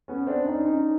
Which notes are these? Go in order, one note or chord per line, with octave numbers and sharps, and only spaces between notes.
B3 C#4
C4 D4
C#4 D#4
C#4 D#4